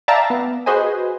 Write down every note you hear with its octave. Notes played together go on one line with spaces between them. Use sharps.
D5 E5 F5 G5 A5 A#5
B3
F#4 G#4 B4 C5 D#5 G#5